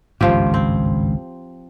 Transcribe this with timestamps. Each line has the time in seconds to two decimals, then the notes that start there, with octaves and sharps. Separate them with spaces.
0.21 G#1 C#2 G2 F3 G4
0.54 C4